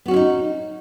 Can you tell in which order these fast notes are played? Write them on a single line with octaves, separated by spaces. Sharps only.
B3 F#4 C#4 E4 D#4